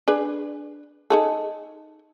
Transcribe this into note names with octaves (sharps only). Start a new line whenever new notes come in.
D4 G#4 B4
D#4 G#4 A4